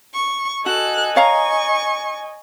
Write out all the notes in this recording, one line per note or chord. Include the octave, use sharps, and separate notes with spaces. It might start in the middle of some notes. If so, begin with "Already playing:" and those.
C#6
F#4 A4 D#5 G#5 F#6
C#5 F5 A#5 C#6